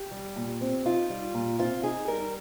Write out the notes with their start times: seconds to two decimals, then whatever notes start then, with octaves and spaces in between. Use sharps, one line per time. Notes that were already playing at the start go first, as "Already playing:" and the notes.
Already playing: G4
0.11 G3
0.36 A#2
0.61 C4
0.85 D#4 F4
1.10 G3
1.34 A#2
1.59 C4 F4
1.84 D#4 G#4
2.08 G3 A#4